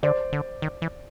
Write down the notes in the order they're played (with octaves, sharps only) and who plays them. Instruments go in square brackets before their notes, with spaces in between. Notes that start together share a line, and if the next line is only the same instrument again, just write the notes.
[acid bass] D3 [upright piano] C5 D5
[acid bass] D3
D#3
E3